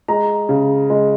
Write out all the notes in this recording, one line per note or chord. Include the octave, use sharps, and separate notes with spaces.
G#3 A#5
C#3
G#3